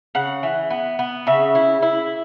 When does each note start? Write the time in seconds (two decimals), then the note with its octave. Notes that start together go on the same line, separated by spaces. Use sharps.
0.15 C#3 F#5
0.43 E3
0.70 B3
0.99 B3
1.27 C#3 E5
1.55 E4
1.82 E4